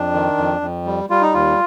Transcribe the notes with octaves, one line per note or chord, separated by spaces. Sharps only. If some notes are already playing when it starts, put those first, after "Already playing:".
Already playing: F2 D4
D#3
F2
F2
G3
G3 F4
D#4
D#2 F4